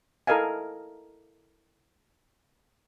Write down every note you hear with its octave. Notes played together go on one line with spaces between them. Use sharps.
E4 A4 A#4 D#5 F5 G#5